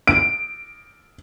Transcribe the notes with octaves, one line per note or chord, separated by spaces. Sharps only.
D7